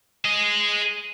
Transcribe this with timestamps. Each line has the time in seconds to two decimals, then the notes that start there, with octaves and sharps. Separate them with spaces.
0.25 G#4 D#5